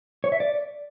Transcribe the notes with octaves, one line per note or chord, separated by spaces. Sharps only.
C#5
E5
D5